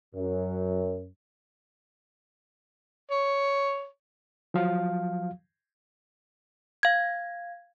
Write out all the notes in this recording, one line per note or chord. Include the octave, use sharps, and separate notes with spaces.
F#2
C#5
F3 F#3 F5
F5 G#6